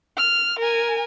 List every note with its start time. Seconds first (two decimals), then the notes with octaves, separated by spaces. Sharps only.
0.17 F6
0.59 A#4 G#5